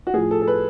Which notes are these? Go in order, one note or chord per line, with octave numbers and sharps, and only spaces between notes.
F#4
A2 F3 G#4
A4
A4
B4